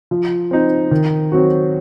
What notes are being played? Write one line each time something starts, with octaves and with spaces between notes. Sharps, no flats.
F3
C4 D#4
D#3
F#3 C4 F#4